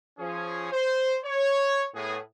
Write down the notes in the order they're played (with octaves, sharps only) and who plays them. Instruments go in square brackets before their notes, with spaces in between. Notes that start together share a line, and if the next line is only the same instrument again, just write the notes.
[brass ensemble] F3 C#4 G#4
C5
C#5
A2 B3 G#4